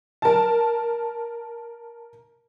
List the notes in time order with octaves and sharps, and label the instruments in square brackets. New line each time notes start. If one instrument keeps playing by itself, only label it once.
[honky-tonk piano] A#4 A5